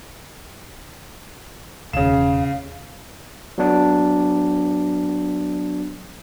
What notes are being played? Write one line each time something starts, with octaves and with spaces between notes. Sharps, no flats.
E1 D#2 C#3 F5 E7
F#3 B3 D4